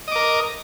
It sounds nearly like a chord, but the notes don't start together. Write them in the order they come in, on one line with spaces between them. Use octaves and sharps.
D#5 D6 A#4